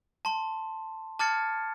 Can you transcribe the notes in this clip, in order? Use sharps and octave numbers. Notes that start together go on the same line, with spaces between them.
A5 C6
A5 D6 F6 G#6 A6 C#7